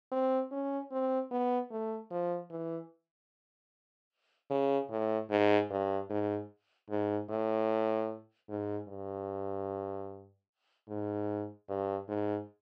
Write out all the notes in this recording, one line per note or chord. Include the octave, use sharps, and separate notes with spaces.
C4
C#4
C4
B3
A3
F3
E3
C#3
A2
G#2
G2
G#2
G#2
A2
G#2
G2
G#2
G2
G#2